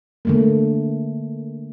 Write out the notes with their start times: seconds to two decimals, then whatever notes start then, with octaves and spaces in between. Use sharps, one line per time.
0.25 D3 A3 A#3